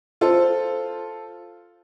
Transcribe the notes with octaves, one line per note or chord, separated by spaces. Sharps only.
F4 A4 C5